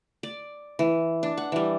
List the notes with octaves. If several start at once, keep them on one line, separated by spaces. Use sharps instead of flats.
D5
E3
D4
F#5
E3 G3